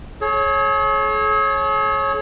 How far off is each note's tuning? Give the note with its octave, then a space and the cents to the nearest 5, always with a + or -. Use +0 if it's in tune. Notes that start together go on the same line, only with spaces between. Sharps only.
G#4 +45 C#5 -15